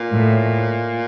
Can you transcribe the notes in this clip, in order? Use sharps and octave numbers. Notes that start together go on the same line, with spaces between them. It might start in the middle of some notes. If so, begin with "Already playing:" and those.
Already playing: A#2
A2